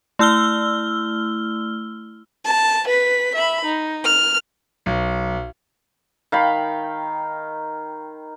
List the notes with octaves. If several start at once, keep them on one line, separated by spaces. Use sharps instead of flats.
A3 E4 E6 F6 G7
A5
B4 B6
E5 B5
D#4
F6
B1
D#3 F5 G5 B5